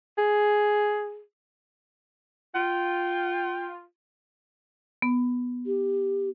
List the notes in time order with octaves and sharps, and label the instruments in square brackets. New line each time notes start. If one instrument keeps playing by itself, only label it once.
[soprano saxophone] G#4
[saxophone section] F4 [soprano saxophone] G5
[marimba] B3
[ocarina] G4